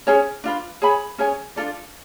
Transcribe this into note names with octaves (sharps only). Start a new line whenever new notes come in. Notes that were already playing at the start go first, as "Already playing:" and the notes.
C#4 G#4 C#5 G#5
D4 F4 B4
G#4 C#5 G#5 B5
C#4 G#4 C#5 G#5
D4 F4 A4 D5